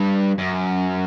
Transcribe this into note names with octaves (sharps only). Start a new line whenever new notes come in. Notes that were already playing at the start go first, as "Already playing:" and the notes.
Already playing: G2
F#2